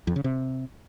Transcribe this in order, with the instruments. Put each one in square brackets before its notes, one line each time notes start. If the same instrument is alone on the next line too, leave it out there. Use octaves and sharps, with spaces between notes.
[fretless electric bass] F2
C#3
C3